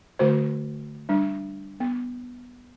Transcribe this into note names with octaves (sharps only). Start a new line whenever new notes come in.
D3 A3 F#4 C5
G3 D4
B3